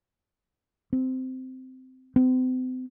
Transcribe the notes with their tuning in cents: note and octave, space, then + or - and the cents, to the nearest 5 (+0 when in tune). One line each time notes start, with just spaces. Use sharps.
C4 -15
C4 -40